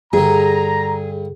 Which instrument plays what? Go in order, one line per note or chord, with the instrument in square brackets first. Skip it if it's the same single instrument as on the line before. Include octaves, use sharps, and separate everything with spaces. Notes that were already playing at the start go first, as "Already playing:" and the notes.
[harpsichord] G2 D3 [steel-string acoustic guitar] G#4 [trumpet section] A#5